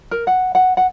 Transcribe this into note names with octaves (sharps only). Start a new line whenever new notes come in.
A#4
F#5
F#5
F#5